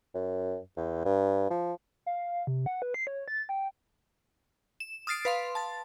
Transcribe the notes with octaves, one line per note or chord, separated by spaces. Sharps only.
F#2
E2
G2
F3
F5
C3
F#5
B4
C7
C#5
A6
G5
E7
D#6 F6 A6 C7 D7
B4 F5 C6
A5 A6